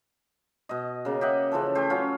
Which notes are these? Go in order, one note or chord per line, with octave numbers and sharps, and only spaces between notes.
B2 D#5
C#3 A#3
G4 D#5 E5 F#5
C#3 E3 F3 A4
A3 G4 C5
F#3 C#4 F4